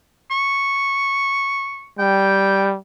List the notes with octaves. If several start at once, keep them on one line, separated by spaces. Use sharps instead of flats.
C#6
G3 G5